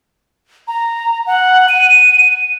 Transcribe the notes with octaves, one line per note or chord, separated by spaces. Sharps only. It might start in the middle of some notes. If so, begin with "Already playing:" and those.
A#5
F#5
D#7